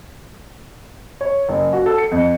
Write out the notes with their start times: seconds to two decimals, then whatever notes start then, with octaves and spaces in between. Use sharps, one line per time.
1.21 C#5
1.49 F#1
1.73 F#4
1.86 A4
1.98 C#7
2.12 F2